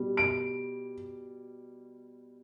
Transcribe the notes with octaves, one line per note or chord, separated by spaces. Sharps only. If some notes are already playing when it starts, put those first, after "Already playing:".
Already playing: B2 G3
D7